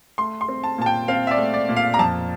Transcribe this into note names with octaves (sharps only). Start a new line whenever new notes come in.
A3 C6
C6
C4
A5
A#2 A5
G5
C4 F5
E5
D5
A3
D5
A#2
F5
A#5
F2 A5